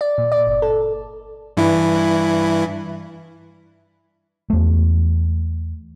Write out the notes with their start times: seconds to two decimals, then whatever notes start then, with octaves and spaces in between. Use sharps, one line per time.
0.01 D5
0.18 A#2
0.32 D5
0.47 G1
0.62 A4
1.57 G2 E3 E4
4.50 E2 A3